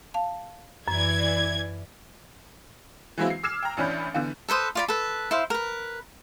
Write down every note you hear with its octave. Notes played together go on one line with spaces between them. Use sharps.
F5 A5
F#2 E3 D5 G#6
E3 F#3 G#3 A#3 C4 E4
C7
D6 E6 F6 G#6 C7 E7
G5 A#5
A1 E3 C#4 D4 B5 G6
D3 E3 B3
A4 B4 C5 D#6
F4 D5 B5
A4 B4
E4 C5 F5
A#4 B4